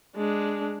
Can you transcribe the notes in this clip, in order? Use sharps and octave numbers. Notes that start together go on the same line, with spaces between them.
G#3 D4